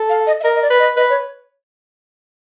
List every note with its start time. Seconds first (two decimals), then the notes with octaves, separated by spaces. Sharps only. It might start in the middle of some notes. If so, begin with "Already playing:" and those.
Already playing: A4
0.09 F5
0.27 D#5
0.40 E5
0.43 A#4 D#5
0.55 D#5
0.62 D5
0.70 B4
0.79 D#5
0.96 B4 D#5
1.10 C#5